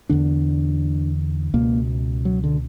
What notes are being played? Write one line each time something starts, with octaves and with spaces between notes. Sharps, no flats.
E2 D3 D4
C#2 B2 A#3
F#3
D3